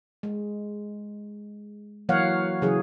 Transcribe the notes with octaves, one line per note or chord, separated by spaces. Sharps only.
G#3
E3 F#3 A#3 C#5 F5 F#5
C#3 E3 F#3 G#4